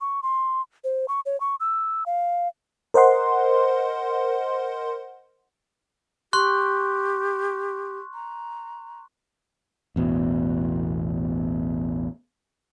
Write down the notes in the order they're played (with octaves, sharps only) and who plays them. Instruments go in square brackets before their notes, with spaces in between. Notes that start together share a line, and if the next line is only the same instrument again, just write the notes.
[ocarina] C#6
C6
C5
C#6
C#5
C#6
E6
F5
[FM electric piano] A#4 C5 D#5 F#5 C6
[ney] G4 [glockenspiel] C6 C#6 F#6
[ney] A#5
[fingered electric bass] A1 E2 B2